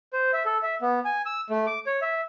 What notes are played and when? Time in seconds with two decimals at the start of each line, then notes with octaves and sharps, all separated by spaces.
0.13 C5
0.33 E5
0.45 A4
0.63 E5
0.82 B3
1.05 G#5
1.26 E6
1.50 A3
1.67 D6
1.86 C#5
2.02 E5